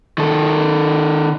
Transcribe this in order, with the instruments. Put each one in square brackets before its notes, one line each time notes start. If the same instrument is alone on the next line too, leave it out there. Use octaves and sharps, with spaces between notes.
[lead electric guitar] D#3 A4